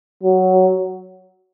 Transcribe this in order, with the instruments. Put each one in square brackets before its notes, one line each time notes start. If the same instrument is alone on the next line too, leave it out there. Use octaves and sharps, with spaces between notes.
[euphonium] F#3